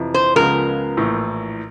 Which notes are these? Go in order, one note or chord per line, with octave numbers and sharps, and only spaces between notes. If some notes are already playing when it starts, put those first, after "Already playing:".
Already playing: F2 C3 E3
C5
C#2 C#3 F3 G#3 B3 A#4
A#1 A2 E3